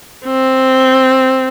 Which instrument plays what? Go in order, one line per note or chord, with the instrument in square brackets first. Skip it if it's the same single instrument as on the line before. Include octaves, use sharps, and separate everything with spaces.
[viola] C4